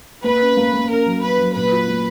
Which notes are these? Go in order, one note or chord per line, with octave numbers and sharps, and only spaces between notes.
A#3 B4
C#4
A#3
A#3
C#4 A#4
F#3
C#4 B4
F#3
A#2 B4
F4
A#3